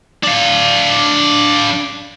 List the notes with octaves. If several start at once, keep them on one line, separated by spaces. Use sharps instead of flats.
D4 F5